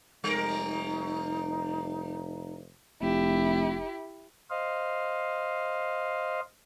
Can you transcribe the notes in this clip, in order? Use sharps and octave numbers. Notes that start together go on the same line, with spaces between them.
F1 G3 D#4 A#4
F1 E4 G4
C5 D#5 F5